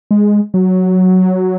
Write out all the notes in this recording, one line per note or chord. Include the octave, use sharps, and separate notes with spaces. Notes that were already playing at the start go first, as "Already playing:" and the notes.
G#3
F#3